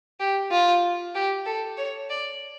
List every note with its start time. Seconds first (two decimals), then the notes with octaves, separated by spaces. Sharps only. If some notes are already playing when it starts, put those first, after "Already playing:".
0.20 G4
0.51 F4
1.15 G4
1.46 A4
1.77 C#5
2.10 D5